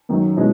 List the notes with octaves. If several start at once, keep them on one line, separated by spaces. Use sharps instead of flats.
F#2 D#3 F#3
B2 G#3 C#4 E4